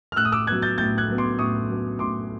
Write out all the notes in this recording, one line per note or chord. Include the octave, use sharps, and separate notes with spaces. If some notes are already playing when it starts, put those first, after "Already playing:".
F6
A2 E6 F#6
D#6
D6 E6
F#3 B3 F#6 G#6
G6 A6
A2 G6 A6
F#6 G#6
F#3 B3
C6 D6
A2 C#6 D#6
F#3 B3
A2 C6 D6